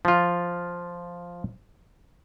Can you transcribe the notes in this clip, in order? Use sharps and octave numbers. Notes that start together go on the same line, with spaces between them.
F3 F4